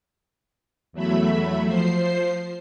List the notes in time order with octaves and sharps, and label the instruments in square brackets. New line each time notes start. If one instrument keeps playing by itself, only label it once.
[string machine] E2 F#3 A3 E5 B5
F3 C5 C7